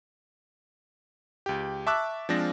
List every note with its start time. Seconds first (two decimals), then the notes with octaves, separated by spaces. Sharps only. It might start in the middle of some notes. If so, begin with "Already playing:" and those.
1.46 C#2 G4
1.87 E5 A5 C#6 D6 E6 F#6
2.29 F3 G#3 C4 D4 F4 A#6